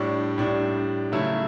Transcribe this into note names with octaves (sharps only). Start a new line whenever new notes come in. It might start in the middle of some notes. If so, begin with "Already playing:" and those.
Already playing: A2 G3 D4
A2 G3 D4
C#3 F#3 A3 E4